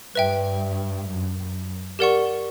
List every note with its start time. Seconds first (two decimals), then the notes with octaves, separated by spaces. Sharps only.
0.15 G2 B4 E5 G5
1.07 F#2
1.38 F#2
1.99 G4 A#4 D5 F#5 C#6